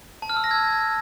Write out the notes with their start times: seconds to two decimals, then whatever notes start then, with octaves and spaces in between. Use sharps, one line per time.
0.22 A5
0.29 F6
0.37 E6
0.44 A#6
0.51 G#6